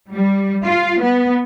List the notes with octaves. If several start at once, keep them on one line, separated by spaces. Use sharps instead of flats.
G3
F4
B3